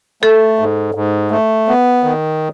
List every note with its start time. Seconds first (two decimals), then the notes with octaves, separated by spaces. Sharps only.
0.22 A3 A4
0.59 G#2
0.95 G#2
1.31 A3
1.68 B3
2.04 D#3